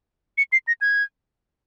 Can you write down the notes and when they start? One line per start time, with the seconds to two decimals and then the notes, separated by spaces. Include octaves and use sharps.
0.38 C#7
0.53 C7
0.67 A#6
0.81 G#6